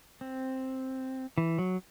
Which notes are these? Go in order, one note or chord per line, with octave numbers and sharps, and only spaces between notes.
C4
E3
F#3